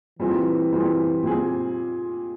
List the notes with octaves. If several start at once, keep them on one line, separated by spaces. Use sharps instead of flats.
A#2 E3 G3 C4 F4 G#4
A#2 G3 C4 F4 G#4
A#2 G3 C4 F4 G#4